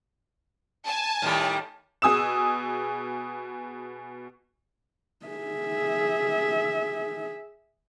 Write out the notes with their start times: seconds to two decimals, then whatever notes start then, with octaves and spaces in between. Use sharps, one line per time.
0.86 G#5 A5
1.22 A2 D#3 G3
2.02 B2 G#4 D#6 E6 E7
5.26 G#4 E5